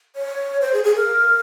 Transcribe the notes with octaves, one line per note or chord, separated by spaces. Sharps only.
C#5
C5
G#4
G#4
A#4